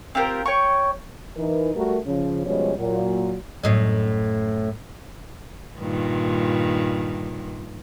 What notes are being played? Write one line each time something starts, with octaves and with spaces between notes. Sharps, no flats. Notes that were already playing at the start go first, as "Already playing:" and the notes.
C4 F4 G4 A#4
C#5 G5 C#6
E3 D#4 A#4
G3 A3 F#4 A#4
C#3 F3 C#4
B2 F3 G3 G#3 C#4
A#2 F#3
F#2 A2 D#5
G2 A#2 D#3